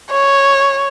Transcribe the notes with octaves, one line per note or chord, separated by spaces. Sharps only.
C#5